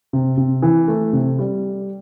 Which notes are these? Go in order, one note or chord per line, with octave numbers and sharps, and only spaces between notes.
C3
C3
E3
A3
C3
G3